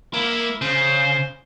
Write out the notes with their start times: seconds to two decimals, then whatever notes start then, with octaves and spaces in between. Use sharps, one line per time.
0.14 A#3 E4
0.62 C#3 C5